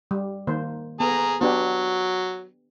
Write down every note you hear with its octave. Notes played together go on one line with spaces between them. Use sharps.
G3
D#3 A#3 C5
B3 G#4 A4 A#5
F#3 B3 D4 G4